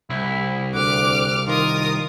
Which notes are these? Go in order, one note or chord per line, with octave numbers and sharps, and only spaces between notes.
C2 E4
D2 F#5 D6 F6
D#3 F4 A#4 D#6